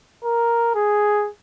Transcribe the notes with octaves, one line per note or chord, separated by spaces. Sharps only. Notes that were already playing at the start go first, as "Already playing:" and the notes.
A#4
G#4